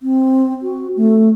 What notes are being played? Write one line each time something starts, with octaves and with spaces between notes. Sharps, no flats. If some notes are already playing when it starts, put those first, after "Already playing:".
C4
F#4
A3